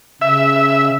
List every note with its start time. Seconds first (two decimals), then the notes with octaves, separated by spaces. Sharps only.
0.21 C#3 E5